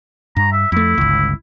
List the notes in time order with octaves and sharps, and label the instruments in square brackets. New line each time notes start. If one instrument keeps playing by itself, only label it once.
[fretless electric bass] G2 [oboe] A#5
[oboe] E5
[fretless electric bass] F2 A3 [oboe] E4
[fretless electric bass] G1 C#2